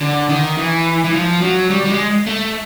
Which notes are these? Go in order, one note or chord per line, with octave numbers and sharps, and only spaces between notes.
D3
D#3
E3
E3
F3
F#3
G3
G3
G#3
A3